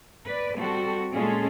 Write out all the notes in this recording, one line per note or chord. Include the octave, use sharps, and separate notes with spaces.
B4 D5
G3 C4 F#4 A4
A#2 G#3 C#4 F4 G#4 A4